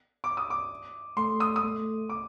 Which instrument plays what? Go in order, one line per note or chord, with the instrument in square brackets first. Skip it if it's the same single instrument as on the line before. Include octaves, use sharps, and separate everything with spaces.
[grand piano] D6
D#6
D6
[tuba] A3 [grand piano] C6
[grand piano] D#6
D#6
[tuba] A3
[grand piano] D6